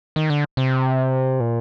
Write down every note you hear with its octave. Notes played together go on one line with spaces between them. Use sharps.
D#3
D3
C3
A#2